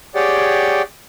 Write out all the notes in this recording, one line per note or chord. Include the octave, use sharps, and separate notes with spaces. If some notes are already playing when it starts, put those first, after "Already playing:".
G4 G#4 C#5 D5 F#5 G5